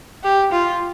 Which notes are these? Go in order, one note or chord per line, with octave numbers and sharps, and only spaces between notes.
G4
F4